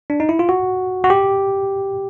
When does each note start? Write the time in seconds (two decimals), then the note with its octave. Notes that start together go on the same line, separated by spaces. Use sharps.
0.10 D4
0.20 D#4
0.29 E4
0.39 F4
0.49 F#4
1.04 F#4
1.10 G4